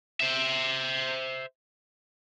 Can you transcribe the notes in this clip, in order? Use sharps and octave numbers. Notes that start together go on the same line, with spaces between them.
C5 E5